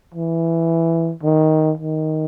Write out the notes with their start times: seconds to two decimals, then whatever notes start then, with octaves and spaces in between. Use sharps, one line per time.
0.14 E3
1.23 D#3
1.77 D#3